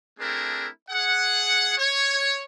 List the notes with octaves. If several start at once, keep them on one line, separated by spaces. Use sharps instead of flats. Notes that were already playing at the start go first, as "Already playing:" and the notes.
A3 C4 D4 E4 G#4 A#4
G#4 F#5
C#5